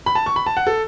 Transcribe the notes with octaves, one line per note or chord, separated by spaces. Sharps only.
B5
A5
C#6
B5
A5
F#5
A4